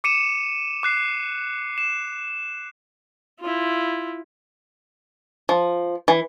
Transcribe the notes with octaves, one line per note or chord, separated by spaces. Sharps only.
D6 C#7 D#7 E7
D6 F#6 C7
E7
E4 F4
F3
E3